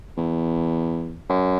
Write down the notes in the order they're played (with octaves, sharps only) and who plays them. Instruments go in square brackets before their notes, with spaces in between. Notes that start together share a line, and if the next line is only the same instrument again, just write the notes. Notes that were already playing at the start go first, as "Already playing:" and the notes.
[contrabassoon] E2
F#2